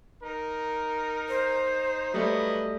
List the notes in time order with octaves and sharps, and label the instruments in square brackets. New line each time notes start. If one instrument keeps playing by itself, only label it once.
[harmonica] D#4 [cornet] A#4
[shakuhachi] C5
[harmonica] F#3 B3 [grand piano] G3 A3 [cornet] D#5